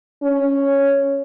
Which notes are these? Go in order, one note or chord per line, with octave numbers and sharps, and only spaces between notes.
C#4